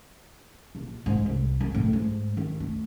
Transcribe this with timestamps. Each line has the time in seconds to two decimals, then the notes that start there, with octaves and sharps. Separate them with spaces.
0.75 A#1
1.06 G#2
1.26 C2
1.61 F#2
1.74 A2
1.93 G#2
2.37 D#3
2.60 A3